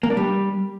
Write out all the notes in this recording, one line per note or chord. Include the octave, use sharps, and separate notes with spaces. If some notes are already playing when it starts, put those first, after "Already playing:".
A#3
D4
G3